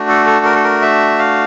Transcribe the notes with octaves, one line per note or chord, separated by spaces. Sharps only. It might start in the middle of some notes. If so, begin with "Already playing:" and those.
Already playing: A3 D4 F#4
A4
A4
A#4
A4
A#4
E5
F5